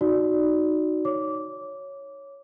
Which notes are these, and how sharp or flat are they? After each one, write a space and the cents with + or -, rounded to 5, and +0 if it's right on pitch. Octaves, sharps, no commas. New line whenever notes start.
D#4 +0 F#4 +0 D5 +0
C#5 +0 D6 -15